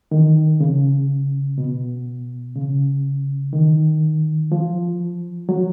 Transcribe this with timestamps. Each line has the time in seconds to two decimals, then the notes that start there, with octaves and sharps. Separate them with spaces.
0.11 D#3
0.60 C#3
1.58 B2
2.55 C#3
3.53 D#3
4.52 F3
5.49 F#3